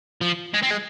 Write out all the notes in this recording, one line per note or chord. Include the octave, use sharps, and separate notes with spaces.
F3
G#3
C4
G#3